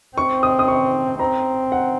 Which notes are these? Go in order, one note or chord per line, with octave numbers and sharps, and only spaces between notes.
C4 C#6
D#6
D#6
C#6
C4 A#5
F#5